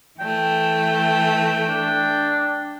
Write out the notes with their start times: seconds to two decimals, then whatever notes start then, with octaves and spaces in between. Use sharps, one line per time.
0.20 E3 A3 G5
1.67 D4